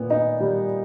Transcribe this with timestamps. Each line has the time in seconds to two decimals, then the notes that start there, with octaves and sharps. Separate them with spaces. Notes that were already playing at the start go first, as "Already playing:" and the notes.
Already playing: A#2 B3
0.10 D#4
0.40 G3